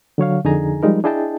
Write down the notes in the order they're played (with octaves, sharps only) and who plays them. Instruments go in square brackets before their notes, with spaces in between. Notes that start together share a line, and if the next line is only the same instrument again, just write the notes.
[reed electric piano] D3 F#3 C#5 F5
F2 D3 D#4 G#4 G#5 A#5
F3 G3 G#3 D#4 A#4
D4 E4 G#4 D#5 G5 A5